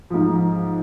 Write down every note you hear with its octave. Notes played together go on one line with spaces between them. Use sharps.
G#2 F3